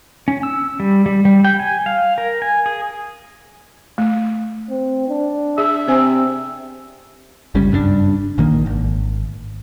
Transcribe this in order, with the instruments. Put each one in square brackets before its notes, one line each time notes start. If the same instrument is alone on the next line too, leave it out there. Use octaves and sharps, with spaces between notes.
[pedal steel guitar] C#4
E6
G3
G3
G3
G5
G#5
F5
A#4
G#5
G#4
[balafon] A3
[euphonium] C4
D4
[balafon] G#4 [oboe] E5
[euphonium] C3 [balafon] C4 C5 G#5
[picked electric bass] G1 C#2 G3 C#4
F#1 G2 C3 D4
A#1 D#3 A#3
G#1